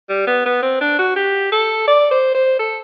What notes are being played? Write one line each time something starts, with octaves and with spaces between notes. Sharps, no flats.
G3
B3
B3
C4
D4
F#4
G4
A4
D5
C5
C5
A4